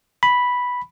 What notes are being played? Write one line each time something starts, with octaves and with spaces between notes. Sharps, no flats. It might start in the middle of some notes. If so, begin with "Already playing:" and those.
B5